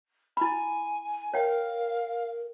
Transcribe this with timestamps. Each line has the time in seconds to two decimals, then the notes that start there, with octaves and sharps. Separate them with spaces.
0.37 E4 G#5 B5
1.34 A#4 C#5 F5 G5